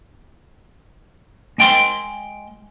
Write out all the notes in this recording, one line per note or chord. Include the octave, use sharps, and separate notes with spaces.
G#3 G5 C6